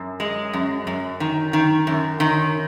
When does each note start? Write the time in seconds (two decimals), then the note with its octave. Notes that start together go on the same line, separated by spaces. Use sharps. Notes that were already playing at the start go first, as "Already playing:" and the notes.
Already playing: F#2
0.20 G#3
0.53 F#2
0.87 F#2
1.20 D#3
1.53 D#3
1.87 F#2
2.20 D#3